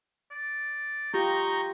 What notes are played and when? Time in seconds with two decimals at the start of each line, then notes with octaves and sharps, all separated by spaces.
0.31 D5
1.14 D#4 F4 G4 A#5 C#6 G6